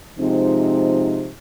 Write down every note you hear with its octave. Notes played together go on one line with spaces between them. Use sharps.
C3 F3 G#3 C4 D#4